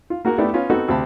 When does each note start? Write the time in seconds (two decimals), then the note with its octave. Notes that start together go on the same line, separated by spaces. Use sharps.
0.10 F4
0.25 A#3 F#4 G#4 A#4
0.38 A3 B3 D4 E4 G4
0.54 B3 C#4 F4
0.70 B3 C4 D#4 F#4 A4
0.88 D2 C3 G4 A5 B5